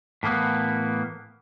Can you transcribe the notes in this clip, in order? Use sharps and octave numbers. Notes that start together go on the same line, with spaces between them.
A2 E3 A#3 B3